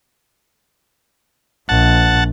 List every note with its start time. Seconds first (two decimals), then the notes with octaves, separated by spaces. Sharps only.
1.69 A#1 F#5 A5